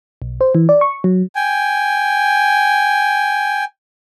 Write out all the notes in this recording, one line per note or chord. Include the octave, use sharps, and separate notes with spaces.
B1
C5
E3
D5
C#6
F#3
G5 G#5